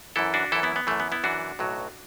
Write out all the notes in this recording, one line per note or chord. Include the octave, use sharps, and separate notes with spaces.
F#2 E3 E4 A4
D4 F#4
F#2 E3 E4 A4
B3 E4
B3
F#2 E3 A3
B3
B3 E4
F#2 E3 D4 F#4
B1 A2 F#3